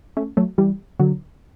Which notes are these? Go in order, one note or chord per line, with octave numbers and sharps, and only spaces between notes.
A3 C#4
F#3 A3
E3 G3
D3 F#3